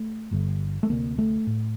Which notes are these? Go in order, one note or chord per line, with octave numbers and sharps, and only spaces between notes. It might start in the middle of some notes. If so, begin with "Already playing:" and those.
Already playing: A3
G1 G2 D3
A3
D2 C3 A#3
A3
A2